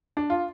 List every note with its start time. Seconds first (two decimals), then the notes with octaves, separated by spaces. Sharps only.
0.17 D4
0.30 F4